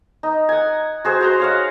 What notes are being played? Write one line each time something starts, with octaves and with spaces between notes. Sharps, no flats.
D#4
F#5 G#5
F#4 G#4 C5
F#4 A#5 C6
C#5 F5 F#5